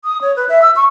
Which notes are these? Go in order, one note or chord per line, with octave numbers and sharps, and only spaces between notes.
D#6
C#5
B4
E5
E6
C#6